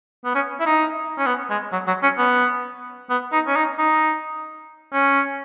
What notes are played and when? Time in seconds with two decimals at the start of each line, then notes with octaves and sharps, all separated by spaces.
0.25 B3
0.35 C#4
0.60 E4
0.66 D#4
1.18 C#4
1.26 B3
1.50 G#3
1.72 F#3
1.87 F#3
2.03 C#4
2.18 B3
3.10 B3
3.32 D#4
3.47 C#4
3.56 D#4
3.79 D#4
4.93 C#4